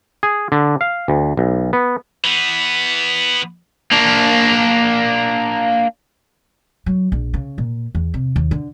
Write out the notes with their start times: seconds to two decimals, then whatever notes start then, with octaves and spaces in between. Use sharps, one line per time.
0.23 G#4
0.52 D3
0.81 F5
1.08 D2
1.37 B1
1.73 B3
2.24 E3 B3
3.92 A#3 D4
6.86 F#3
7.12 A#1
7.34 C#3
7.58 A#2
7.95 E2
8.14 C3
8.36 D#2
8.51 D3